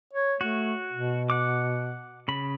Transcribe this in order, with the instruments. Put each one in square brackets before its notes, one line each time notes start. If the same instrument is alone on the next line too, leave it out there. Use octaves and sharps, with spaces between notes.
[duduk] C#5
[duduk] A3 [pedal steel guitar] F#4
[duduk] B2
[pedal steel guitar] F#5 D6
C#3 B5